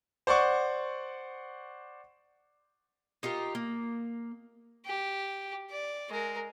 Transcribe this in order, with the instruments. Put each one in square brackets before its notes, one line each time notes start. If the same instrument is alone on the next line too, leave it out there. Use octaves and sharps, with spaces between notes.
[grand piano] C5 D5 F#5 C#6
[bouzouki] D#4 F4 G4 A#4
A#3
[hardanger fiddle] G4
D5
G#3 A#4